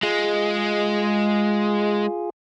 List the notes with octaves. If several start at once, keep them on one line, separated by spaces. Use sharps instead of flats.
G#3 F4 G#4